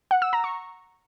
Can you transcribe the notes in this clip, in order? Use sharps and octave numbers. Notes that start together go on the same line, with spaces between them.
F#5
E6
A#5
C#6